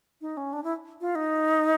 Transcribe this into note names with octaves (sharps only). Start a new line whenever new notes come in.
D#4
C#4
D4
E4
F4
D#4